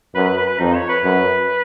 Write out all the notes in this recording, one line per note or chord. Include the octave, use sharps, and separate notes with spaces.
F#2 B4
B4
B4
B4
F2 D#4
C#5
B4
F#2